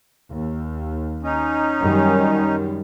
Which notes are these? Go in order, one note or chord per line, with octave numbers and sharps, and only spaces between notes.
D#2
C#4 D#4
F#2 D#3 G3